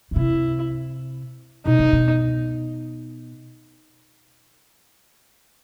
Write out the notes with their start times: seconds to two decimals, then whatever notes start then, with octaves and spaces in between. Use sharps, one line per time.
0.11 C#3
0.16 C3 E4
1.65 B2 D#4
1.79 C3
1.92 B2